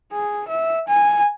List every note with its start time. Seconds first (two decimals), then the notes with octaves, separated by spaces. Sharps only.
0.12 G#4
0.48 E5
0.88 G#5